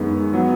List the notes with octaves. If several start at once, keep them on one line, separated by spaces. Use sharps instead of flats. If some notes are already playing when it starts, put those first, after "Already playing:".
Already playing: F#2 D#3 G#3 B3
F#3 B3